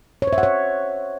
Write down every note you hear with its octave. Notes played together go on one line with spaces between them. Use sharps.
C#5
C5
E5
F#5
C#5